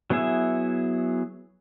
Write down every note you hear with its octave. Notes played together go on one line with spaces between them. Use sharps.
F#3 B3 E4 G#4 E5